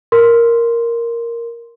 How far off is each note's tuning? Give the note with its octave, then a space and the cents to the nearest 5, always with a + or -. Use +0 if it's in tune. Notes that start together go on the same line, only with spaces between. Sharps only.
A#4 +0 C6 +0